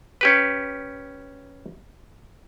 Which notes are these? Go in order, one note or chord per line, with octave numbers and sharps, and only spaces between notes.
C#4 G4 B4